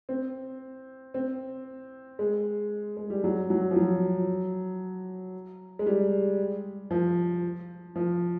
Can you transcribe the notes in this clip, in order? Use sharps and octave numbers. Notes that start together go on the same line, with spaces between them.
C4
C4
G#3
G#3
G3
F#3
F#3
F3
F#3
G#3
G3
F3
F3